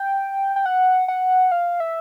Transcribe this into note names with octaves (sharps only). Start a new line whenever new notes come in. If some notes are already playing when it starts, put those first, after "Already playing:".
Already playing: G5
G5
F#5
F#5
F5
E5